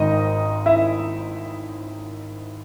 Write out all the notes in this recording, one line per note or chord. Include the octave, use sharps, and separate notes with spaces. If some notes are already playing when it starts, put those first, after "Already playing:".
Already playing: G#1 G#2 D#3 D#4 D#5
E4 E5